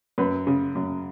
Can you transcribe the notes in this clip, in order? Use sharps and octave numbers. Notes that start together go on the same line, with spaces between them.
F#2 B4
C#3
F#2